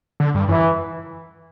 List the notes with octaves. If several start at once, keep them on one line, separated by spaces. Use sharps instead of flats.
D3
G2
F#2 E3